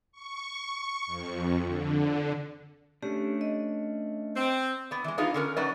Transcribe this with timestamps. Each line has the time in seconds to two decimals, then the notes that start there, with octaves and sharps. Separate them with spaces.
0.12 C#6
1.06 F2
1.65 D3
3.03 A3 C#4 D4 G4
3.41 D#5
4.36 C4
4.91 B3 D5
5.04 E3 G#3
5.18 B3 D4 D#4 F4 G#4 B4
5.34 D3 C#4 A#4
5.56 F#3 C#4 D#4 B4 D5